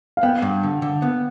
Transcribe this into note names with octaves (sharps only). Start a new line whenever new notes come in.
F5
B3 G5
G2
D3
D3
B3